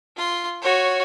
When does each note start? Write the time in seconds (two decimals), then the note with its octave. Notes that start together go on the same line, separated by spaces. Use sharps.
0.16 F4 C6
0.62 F#4 C#5